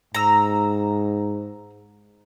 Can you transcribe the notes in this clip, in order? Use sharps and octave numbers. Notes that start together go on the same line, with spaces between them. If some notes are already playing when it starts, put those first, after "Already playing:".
G#2 A#5 E6